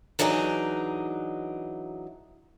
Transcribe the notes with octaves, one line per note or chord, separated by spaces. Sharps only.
E3 F#3 D4 D#4 G#4